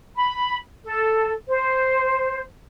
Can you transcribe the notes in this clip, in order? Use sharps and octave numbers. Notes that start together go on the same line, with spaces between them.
B5
A4
C5